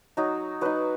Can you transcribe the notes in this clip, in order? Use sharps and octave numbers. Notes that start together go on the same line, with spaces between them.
F#3 D#4
F#3 D#4 B4